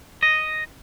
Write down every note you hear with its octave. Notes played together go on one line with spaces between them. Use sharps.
D#5